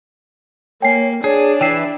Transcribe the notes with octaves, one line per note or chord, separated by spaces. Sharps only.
A#3 C#5 G5 G#5 C7
D4 G#4 C#5
E3 E4 E5 G5 C7